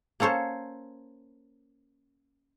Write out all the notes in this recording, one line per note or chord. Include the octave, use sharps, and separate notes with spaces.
A#3 C#4 A4 C5 C#5